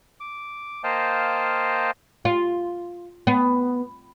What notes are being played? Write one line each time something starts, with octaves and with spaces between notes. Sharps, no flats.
D6
A#3 C5 D#5 F5 G5 A5
F4
B3